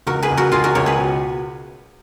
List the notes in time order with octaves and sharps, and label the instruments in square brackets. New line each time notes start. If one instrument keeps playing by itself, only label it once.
[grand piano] C#2 [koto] F#4 A#4
[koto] G#4 B4
[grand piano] C#2
[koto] F#4 A#4
[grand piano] C#2 [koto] F4 G#4
[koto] F#4 A#4
[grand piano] C#2 [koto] A#4 C#5
[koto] G#4 B4
[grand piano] B2